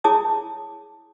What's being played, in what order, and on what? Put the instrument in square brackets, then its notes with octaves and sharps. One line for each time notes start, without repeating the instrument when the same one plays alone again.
[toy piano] E4 G#4 C#5 A5 D6 D#6